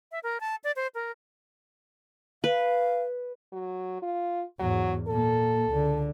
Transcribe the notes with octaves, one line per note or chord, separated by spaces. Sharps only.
E5
A#4
A5
D5
C5
A#4
B4 F5
F#3
F4
E2 G#2 F#3
A#2 A#3 A4
C#2 D3